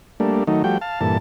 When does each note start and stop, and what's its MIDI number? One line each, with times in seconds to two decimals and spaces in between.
0.20 0.44 55
0.20 0.44 57
0.20 0.44 58
0.20 0.44 62
0.47 0.63 51
0.47 0.63 54
0.47 0.63 57
0.47 0.63 63
0.64 0.78 53
0.64 0.78 55
0.64 0.78 57
0.64 0.78 66
0.64 0.78 79
0.81 1.00 77
0.81 1.00 81
1.01 1.18 43
1.01 1.18 46
1.01 1.18 52
1.01 1.18 69
1.01 1.18 81